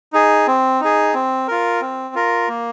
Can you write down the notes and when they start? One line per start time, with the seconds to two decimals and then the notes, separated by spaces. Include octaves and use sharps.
0.13 D#4 G#4
0.47 C4
0.80 D#4 G#4
1.14 C4
1.48 F4 A#4
1.81 C4
2.15 F4 A#4
2.48 A#3